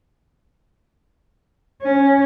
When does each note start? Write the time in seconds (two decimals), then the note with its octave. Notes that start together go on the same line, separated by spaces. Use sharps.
1.82 C#4